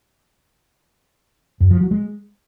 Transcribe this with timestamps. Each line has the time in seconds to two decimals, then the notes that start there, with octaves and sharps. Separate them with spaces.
1.60 F#2
1.71 F3
1.81 F#3
1.91 G#3